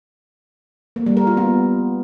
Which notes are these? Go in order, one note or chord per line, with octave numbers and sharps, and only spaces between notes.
A#3
G3
A#4
F4
B3